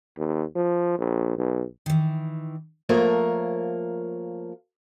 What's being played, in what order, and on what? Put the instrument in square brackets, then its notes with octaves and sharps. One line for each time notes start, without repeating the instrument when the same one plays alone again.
[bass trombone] D#2
F3
A#1
B1
[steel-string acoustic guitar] D#3 E3
F3 A3 A#3 A#4 C#5